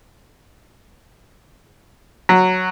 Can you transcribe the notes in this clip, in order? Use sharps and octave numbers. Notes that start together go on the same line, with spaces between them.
F#3